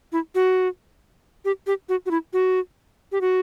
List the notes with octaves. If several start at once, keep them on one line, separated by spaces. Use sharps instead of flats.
E4
F#4
G4
G4
F#4
F#4
E4
F#4
G4
F#4